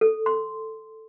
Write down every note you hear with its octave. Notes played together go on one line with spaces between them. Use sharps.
A4
C6